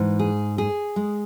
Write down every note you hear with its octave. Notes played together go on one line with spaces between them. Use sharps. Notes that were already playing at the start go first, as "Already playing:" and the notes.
Already playing: G#2 E3
G#4
G#4
G#3